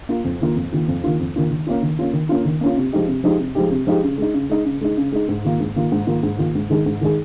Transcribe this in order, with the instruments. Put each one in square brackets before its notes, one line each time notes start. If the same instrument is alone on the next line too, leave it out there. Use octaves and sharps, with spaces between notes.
[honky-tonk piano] A#3 F4
F2
D#3 A#3 F4
F2
D#3 A#3 F4
F2
D#3 A#3 F4
F2
D#3 A#3 F4
D#3
A#3 C#4 F4
D#3
A#3 C#4 F4
D#3
A#3 C#4 F4
D#3
A#3 C#4 F4
C3
F3 G#3 D#4 G4
C3
F3 G#3 D#4 G4
C3
F3 G#3 D#4 G4
C3
F3 G#3 D#4 G4
C#3
G#3 D#4
C#3
G#3 D#4
C#3
G#3 D#4
C#3
G#3 D#4
G#2
D#3 A#3 F4
G#2
D#3 A#3 F4
G#2
D#3 A#3 F4
G#2
D#3 A#3 F4
G#2
D#3 G#3 D#4 G#4
G#2
D#3 G#3 D#4 G#4